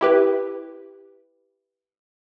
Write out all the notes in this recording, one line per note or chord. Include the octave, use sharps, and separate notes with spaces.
E4 G4 B4